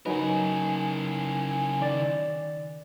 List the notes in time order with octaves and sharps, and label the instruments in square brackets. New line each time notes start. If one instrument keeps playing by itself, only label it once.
[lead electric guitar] C#3 A#4 [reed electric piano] F#3 D#4 B4 [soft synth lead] G#5
[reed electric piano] D#3 D5 A6